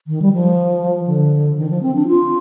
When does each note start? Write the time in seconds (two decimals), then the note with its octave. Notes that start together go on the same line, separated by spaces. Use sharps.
0.07 D#3
0.22 G3
0.33 F3
1.07 D3
1.58 D#3
1.70 F3
1.83 C4
1.95 D4
2.08 F4